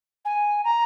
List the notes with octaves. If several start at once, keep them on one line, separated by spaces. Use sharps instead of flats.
G#5
A#5